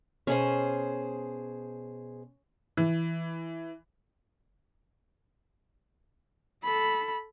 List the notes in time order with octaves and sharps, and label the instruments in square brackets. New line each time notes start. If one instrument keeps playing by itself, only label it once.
[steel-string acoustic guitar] B2 G#4 C5 [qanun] C#4
[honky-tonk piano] E3
[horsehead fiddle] A4 B5